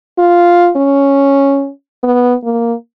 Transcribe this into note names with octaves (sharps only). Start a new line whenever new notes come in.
F4
C#4
B3
A#3